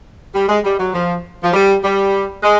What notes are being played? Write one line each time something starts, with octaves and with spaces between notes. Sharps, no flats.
G3
G#3
G3
F#3
F3
F3
G3
G3
G#3